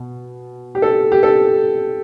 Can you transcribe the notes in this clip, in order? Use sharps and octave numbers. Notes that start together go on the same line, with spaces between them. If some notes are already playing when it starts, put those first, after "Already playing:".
Already playing: B2
G4
A4
G4
A4